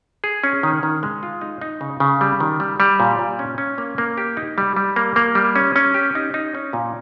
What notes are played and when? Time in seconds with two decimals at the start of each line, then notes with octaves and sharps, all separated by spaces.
0.24 G#4
0.44 C#4
0.63 D#3
0.83 D#3
1.03 G#3
1.23 F4
1.41 D#4
1.61 D#4
1.81 C#3
2.00 C#3
2.21 G3
2.40 D#3
2.60 G3
2.80 G3
3.00 A#2
3.19 A#2
3.39 C#4
3.58 C#4
3.78 A#3
3.98 A#3
4.17 G4
4.37 D#4
4.58 G3
4.76 G3
4.96 A#3
5.16 A#3
5.35 G3
5.56 C#4
5.76 C#4
5.94 G4
6.15 D#4
6.34 D#4
6.55 C#4
6.73 A#2